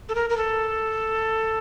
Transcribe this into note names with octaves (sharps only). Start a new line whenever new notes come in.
A4
A#4
A#4
A4